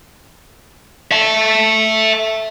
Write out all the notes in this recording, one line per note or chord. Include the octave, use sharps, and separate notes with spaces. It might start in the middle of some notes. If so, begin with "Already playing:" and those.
E5 A5